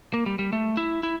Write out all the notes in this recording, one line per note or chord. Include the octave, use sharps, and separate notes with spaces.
A#3
G3
G3
A3
E4
E4